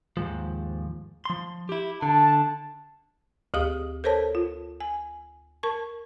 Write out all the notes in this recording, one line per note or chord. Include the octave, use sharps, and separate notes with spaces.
D#2 G#2 F3
F3 C6
E4 G4
D3 A5
D2 G4 G#4 F5 D#6
A4 A#4 C5 C#5 A5
F4
G#5
A#4 A5 C#6